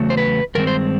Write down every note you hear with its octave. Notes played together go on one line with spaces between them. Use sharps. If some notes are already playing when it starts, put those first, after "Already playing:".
Already playing: E2 C#3 F#3 A3
C5
B4
G2 D#3 G#3 C4 A#4
C5